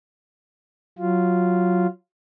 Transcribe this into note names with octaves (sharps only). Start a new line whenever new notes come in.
F#3 F4